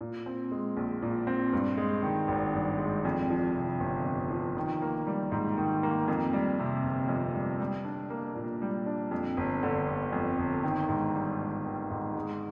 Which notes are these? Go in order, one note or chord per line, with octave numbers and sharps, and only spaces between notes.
A#2
C4
G#3
A#1
A#2
C4
G2
G#3
D#3
G#1
G2
G#3
F2
F3
C3
G1
F2
F3
D#3
A#3
G3
G#2
D#3
A#3
F2
G3
C3
G1
F2
G3
G3
D4
A#3
A#2
G3
D4
F2
G1
D3
G1
F2
G1
D#3
G#2
G3
G#2
D#3
G#2
G#3